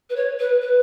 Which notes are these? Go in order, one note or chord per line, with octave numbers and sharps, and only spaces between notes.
B4
C#5
B4
B4